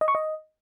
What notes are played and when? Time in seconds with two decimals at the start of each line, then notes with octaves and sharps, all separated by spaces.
0.01 D#5
0.08 C#6
0.15 D#5